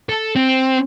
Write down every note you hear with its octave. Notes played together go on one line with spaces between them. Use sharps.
A4
C4